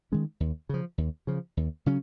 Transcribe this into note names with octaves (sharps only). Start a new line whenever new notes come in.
D#3 G#3 C#4
D#2
C#3 F3
D#2
C#3 F3
D#2
C#3 F#3 C#4